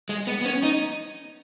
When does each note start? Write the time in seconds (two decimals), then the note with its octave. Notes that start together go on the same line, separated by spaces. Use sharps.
0.09 G#3
0.27 B3
0.41 B3
0.46 C#4
0.63 D#4